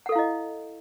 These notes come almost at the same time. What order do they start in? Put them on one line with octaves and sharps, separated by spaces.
F#5 A4 F5 E4 D#5